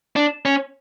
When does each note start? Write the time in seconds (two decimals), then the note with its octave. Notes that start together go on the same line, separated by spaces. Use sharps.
0.16 D4
0.45 C#4